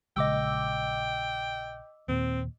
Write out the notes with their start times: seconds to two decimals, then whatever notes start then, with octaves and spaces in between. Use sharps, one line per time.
0.17 A#1 C#3 G#3 D#5 G5 D6 E6
2.08 D#2 A#2 C4